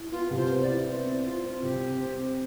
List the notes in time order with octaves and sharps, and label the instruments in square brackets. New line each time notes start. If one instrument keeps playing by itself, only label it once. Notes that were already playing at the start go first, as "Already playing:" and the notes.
Already playing: [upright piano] E4
[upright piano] B3 [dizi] F4
[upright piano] C2
[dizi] C5
[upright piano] B3
[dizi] D5
[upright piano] E4
[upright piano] C4 [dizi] C5
[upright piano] C4
[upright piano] C4 [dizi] F4
[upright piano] C4
[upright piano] C2 [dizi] G4
[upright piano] C4
C4
C4